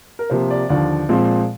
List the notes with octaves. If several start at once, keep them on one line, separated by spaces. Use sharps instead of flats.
A#4
C3 F3 A#3 C5
D5
D#2 D3 F3 D5
A#2 F3 G#3 C4